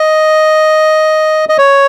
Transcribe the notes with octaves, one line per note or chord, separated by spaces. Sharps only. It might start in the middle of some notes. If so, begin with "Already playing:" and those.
Already playing: D#5
D#5
C#5